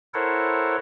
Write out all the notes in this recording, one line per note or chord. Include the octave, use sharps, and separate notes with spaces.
E4 A4 A#4 C5 C#5 F#5